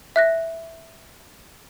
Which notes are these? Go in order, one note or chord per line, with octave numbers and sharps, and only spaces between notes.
E5 F#6 A#6